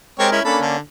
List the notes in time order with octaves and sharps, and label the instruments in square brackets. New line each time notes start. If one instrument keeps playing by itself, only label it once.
[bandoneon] G#3 A#4 [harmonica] C4 G4 C#5
[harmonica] C#4 E4
[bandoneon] A#3 C#4 D4 [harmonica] A4 B5
[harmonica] D3